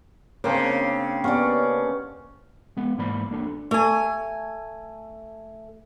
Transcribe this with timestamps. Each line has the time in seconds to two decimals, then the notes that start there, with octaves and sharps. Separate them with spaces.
0.44 C#3 A#3 C4 D4 C#5
1.24 B3 C#4 G4 C#5 D5 F#5
2.77 G#3 B3
2.98 G#2 E3 A#3 D5 B5
3.31 A#3 D4 A4
3.71 A3 G#5